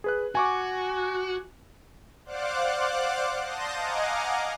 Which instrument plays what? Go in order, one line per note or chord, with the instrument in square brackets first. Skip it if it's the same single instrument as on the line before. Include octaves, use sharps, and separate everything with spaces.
[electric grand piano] G#4 B4 F#6
[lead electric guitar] F#4 [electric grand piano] G#5 C#6 D6
[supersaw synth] C5 D5 F5 F#5 D6 F#6
A5 C6 D#6 G6 A#6
D#5 F5 F#5 G#5 A#5 D6